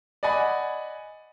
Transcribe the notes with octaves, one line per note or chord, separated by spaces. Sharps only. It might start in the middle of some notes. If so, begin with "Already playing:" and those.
D5 D#5 F#5 G#5 B5